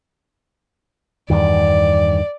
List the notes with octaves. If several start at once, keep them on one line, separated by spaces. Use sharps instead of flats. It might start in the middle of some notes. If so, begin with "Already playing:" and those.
E2 G2 D#3 D5